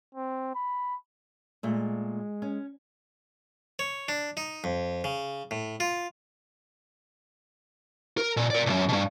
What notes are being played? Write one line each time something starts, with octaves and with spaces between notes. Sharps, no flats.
C4
B5
A#2 G#3 A3
C#4
C#5
D4
D#4
F2
C#3
A2
F4
A#4
A#2
A#4 D5
B1 F#2
G2 B2